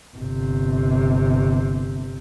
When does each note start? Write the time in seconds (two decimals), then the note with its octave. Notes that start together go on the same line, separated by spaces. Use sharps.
0.17 G1 C3